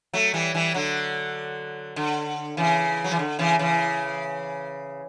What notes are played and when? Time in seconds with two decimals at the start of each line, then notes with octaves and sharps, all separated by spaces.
0.14 F#3 A3
0.34 E3 G3
0.54 E3 G3
0.74 D3 F#3
1.96 D3
2.57 C#3 E3
3.04 F#3
3.11 E3
3.19 D3
3.39 C#3 E3
3.59 C#3 E3